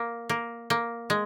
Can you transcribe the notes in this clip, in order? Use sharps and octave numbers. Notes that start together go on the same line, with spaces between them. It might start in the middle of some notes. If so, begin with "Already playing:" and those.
Already playing: A#3
A#3
A#3
G#3